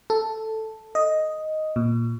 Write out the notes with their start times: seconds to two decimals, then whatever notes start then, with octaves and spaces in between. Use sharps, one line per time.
0.10 A4
0.95 D#5
1.76 A#2